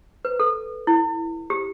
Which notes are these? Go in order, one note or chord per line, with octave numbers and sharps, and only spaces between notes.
B4
A4
E4
G4